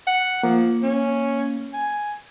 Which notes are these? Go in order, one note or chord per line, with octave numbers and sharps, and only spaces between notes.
F#5
F3 A#3
C#4
G#5